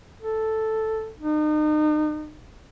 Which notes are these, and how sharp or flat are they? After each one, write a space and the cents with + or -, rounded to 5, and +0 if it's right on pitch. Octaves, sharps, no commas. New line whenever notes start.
A4 +0
D#4 -35